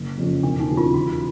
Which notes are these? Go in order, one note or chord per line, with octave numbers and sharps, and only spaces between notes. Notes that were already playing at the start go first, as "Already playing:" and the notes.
Already playing: F#1
F2 C#3
E1 D4
D#4
D#2 C#3 F#3
F4
E1 F#4